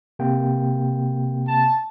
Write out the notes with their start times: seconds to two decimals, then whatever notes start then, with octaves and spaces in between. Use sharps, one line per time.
0.19 C3 A#3 G5
1.47 A5